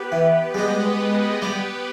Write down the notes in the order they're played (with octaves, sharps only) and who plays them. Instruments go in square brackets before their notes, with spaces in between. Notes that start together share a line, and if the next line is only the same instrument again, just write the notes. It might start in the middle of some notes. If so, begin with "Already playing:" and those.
Already playing: [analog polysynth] B3 G4 B4
[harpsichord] E3
[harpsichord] G3 [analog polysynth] G#3 B3 G4 B4 D#5
[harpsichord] G3 [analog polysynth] B3 G4 B4